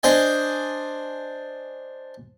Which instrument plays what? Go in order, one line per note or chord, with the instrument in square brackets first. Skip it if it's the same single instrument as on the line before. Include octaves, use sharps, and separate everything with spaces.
[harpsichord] D4 C5 D#5 G#5